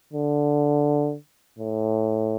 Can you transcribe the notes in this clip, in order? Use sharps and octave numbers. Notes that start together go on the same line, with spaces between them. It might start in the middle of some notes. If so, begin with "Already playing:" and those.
D3
A2